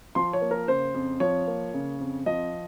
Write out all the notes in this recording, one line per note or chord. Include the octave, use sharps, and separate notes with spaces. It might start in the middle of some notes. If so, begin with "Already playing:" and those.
F3 C6
C#5
A#3
A#4
C#3 C5
F2
F3 C#5
A#3
C#3
F2
F3 D#5